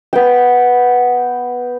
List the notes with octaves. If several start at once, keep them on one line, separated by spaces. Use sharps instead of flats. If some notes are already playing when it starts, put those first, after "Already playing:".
B3 G5